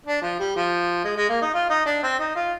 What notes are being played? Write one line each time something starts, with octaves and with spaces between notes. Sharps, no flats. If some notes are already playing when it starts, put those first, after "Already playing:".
D4
F3
G3
F3
G#3
G#3
A#3
D#4
F4
D#4
D4
C4
D#4
F4